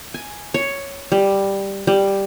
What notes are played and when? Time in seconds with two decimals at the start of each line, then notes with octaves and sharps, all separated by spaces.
0.14 G#5
0.54 C#5
1.12 G3
1.87 G3